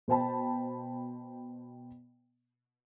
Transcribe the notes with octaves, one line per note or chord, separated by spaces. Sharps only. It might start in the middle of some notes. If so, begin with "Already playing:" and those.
B2 C5 G5 A5 B5